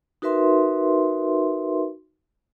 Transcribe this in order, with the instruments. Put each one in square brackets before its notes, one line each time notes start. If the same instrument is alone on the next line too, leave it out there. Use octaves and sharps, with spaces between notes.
[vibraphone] D#4 F#4 A#4 B4 E5 C6